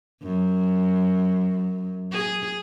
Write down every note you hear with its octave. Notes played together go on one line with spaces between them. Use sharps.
F#2
G#4